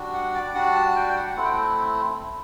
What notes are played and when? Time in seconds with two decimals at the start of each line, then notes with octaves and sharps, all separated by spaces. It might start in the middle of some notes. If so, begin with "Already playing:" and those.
Already playing: G3 D4 F#4
0.14 F#5
0.35 D5
0.55 G3 D4 F#4 F#5
0.75 A5
0.96 G5
1.09 G5
1.17 F#5
1.36 A3 C4 E4 F#5
1.45 G5